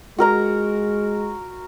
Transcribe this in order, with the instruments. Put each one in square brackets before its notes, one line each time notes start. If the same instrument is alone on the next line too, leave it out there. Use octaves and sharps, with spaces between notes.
[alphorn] G#3 [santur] F#4 A#4 A#5